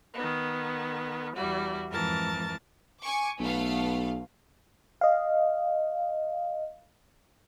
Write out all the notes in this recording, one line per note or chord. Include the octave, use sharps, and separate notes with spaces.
D#3 B3
E2 G3 E4 F#4
F2 G#2 E3 A#4 A5 A6
G#5 C#6 D6
B1 A3 B3 F5
D#5 F5